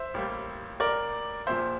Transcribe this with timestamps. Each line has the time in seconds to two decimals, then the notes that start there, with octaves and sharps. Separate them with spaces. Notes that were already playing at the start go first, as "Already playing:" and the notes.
Already playing: C5 E5
0.14 A1 A2 G3 A#3
0.80 A#4 D5
1.47 A#1 A#2 F3 C5 E5